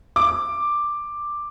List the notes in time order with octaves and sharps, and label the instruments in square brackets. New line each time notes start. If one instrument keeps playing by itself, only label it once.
[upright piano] D6